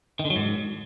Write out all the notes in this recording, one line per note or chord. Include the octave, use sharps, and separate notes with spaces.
D#3
D3
F#3
G#2